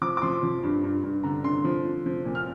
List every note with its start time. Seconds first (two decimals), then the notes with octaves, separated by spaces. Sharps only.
0.02 F3 D6
0.17 D6
0.22 F3 C6
0.43 F3
0.63 G2
0.84 G2
1.04 G2
1.23 D3 A#5
1.44 D3 C6
1.64 F3
1.85 F3
2.06 F3
2.25 A#2
2.35 F6